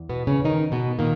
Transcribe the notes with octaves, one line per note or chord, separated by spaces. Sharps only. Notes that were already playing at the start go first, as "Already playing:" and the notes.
Already playing: E2
B2 B3
C#3 C#4
D#3 D#4
B2 B3
A#2 D#3 A#3